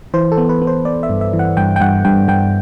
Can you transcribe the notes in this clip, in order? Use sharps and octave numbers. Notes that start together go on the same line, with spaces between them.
E3 C5
A4
B3
B4
B3
C5
B3 D5
E5
G2
E5
E3
F#5
G2 G5
G5
G2 F#5
G2 G5
G2 G5